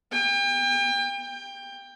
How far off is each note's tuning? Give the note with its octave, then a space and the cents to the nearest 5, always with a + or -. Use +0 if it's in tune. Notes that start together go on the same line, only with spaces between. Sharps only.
G5 +35
G5 +20